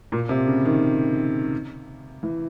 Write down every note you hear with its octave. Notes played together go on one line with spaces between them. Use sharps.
A#2
C3
C#3
D#3
E3